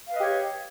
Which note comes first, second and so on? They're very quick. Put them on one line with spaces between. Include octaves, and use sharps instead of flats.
F5 B4 D#5 G4 C#5